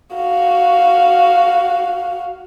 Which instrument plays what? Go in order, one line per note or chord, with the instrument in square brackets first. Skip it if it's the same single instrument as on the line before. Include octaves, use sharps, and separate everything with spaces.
[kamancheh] F#4 F5